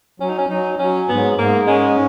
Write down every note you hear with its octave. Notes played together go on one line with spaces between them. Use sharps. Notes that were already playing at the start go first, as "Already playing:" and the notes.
F#3 C#4
D#4
C#4
F#3 D#4
F#3 C#4
G#2 B3
G#2 A#3
G#3 C#4